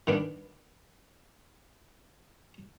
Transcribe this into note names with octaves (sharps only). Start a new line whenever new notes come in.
D#3 B3 D4